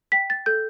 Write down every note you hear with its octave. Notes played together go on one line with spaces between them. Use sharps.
G5 B6
A6
A4 G6